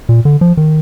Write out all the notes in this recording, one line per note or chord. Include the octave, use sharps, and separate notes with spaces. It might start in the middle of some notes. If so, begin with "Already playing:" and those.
A#2
D3
F3
D#3